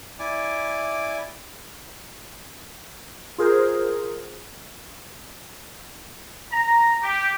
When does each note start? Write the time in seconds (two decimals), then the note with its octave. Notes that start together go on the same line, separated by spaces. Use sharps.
0.19 E4 D5 G#5 D6
3.38 F4 G#4 A#4 C5
6.52 A#5
7.02 G4